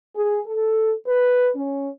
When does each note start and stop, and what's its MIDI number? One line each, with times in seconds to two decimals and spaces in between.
0.15 0.40 68
0.47 0.93 69
1.07 1.49 71
1.55 1.89 61